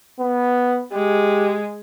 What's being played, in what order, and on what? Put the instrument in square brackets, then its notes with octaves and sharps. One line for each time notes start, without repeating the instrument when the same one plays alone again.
[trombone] B3
[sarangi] G#3 [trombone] G4